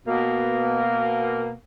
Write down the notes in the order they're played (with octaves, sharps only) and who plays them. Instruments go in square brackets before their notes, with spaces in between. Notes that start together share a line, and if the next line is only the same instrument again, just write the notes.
[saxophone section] B2 A#3